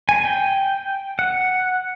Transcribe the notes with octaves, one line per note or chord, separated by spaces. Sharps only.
G#5
G5
F#5